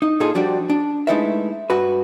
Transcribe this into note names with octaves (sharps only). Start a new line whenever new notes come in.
D#4
A#2 D#4 F4 G#4 A4
F3 G3 D4 F#4 G4 D5
D4
G#3 A3 D#4 E4 B4 E5
G2 F#4 B4